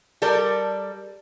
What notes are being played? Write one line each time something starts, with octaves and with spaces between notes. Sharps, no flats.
G3 A4 A#4 D5